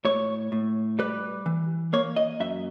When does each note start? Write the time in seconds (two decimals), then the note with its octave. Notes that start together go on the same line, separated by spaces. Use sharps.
0.05 A2 C#5
0.52 A2
0.99 G3 B4
1.46 E3
1.93 A#3 C#5
2.16 D#5
2.40 F#2 E5